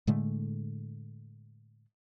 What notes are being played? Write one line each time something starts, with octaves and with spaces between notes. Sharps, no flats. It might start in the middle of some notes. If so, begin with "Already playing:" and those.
A2 D3 G#3 A3